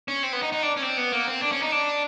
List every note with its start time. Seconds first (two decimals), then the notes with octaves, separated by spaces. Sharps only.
0.08 C#4
0.23 C4
0.33 B3
0.42 D#4
0.52 D#4
0.63 D4
0.77 C#4
0.82 C4
0.97 B3
1.12 A#3
1.27 C4
1.42 D4
1.52 C#4
1.62 D#4
1.72 D4